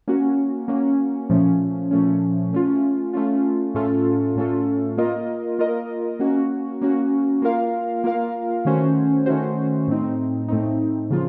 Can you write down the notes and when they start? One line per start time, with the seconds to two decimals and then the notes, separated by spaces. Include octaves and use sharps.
0.08 A#3 C#4 F#4
0.68 A#3 C#4 F#4
1.29 A#2 F3 A3 C#4
1.91 A#2 F3 A3 C#4
2.53 A3 C#4 F4
3.13 A3 C#4 F4
3.74 A2 A3 C#4 F4 A4
4.36 A2 A3 C#4 F4 A4
4.97 A#3 F4 A#4 D#5
5.58 A#3 F4 A#4 D#5
6.19 A#3 C#4 F#4
6.81 A#3 C#4 F#4
7.42 A#3 F4 A#4 F5
8.04 A#3 F4 A#4 F5
8.65 D#3 A3 C#4 F#4 C5
9.26 D#3 A3 C#4 F#4 C5
9.87 A2 A3 C4 D#4
10.48 A2 A3 C4 D#4
11.10 C#3 F3 A#3 F4